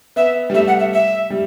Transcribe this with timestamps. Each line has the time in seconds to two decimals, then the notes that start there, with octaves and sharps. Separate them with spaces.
0.16 B3 E5
0.50 G3
0.54 A3 E5
0.67 F#5
0.80 E5
0.93 E5
1.30 G3